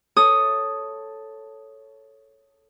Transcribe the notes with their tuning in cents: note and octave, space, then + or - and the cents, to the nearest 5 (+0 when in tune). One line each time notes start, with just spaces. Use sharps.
A4 +0 C#5 +0 D#6 +0